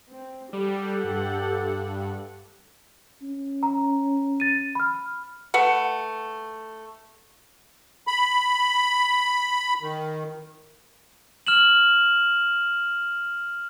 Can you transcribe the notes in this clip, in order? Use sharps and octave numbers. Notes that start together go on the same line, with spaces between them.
C4
G3 G4 A4 F#5
G2
C#4
A#5
A6 D#7
B5 F6
A3 B4 F#5
B5
D#3
F6 E7 F#7